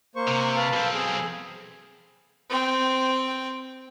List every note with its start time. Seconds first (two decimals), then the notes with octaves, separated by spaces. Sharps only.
0.16 A#3 C5 C#6
0.28 C3
0.56 B4 F5 A5
0.74 B1 C4
0.94 G#4
2.49 C4 G5